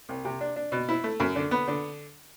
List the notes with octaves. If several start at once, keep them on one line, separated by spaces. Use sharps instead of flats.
C2
C3
D4
D4
B2
E4
A3
F#2
D3
B3
D3